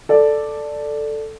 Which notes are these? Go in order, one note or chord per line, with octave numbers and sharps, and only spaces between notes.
A4 D5